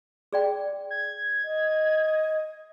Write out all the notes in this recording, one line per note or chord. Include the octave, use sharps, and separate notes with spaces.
G#4 D5 G5
G#6
D#5